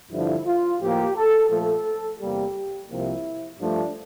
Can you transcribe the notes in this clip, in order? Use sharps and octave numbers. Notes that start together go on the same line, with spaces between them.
G2 D3 F3 E4
F4
A2 F3 A#3 G4
A4
A#2 F3 A3 A4
E2 C3 G3 A#3 G4
C2 C3 F3 A#3 E4
G2 F3 A3 D4